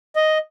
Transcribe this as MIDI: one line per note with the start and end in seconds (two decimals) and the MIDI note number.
0.16 0.38 75